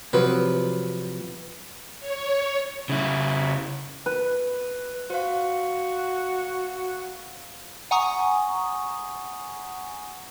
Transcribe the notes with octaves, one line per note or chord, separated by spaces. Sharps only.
C3 F3 F#3 B4
C#5
C#3 E4
B4
F#4 C5 F5
F#5 G#5 A#5 C#6 D#6